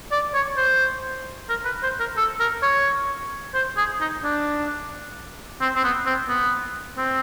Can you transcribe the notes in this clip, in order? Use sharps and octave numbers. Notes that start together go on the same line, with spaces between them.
D5
C#5
C5
A#4
B4
C5
A#4
A4
A#4
C#5
C5
G#4
D#4
D4
C4
C4
B3
C4
B3
C4